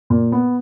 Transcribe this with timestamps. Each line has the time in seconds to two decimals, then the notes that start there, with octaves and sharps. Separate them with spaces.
0.10 A#2
0.32 B3